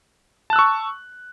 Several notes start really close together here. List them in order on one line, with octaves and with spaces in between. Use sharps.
A5 F#6 E6 C#6